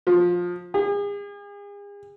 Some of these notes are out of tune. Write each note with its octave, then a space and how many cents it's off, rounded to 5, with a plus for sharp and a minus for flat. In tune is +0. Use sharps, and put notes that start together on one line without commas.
F3 +20
G#4 -40